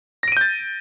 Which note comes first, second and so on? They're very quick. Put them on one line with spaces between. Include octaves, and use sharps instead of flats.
A#6 D7 D#7 G6 A6